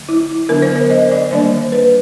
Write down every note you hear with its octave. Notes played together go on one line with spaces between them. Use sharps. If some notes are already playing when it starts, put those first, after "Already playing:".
Already playing: D3 F#3 A3
E4
D3 F#3 B3 D4 A#4
C5
C5
D#5
D5
D#3 G3 A#3 D4 C5
B4